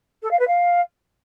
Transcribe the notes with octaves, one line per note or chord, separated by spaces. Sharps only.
A4
F5
B4
F5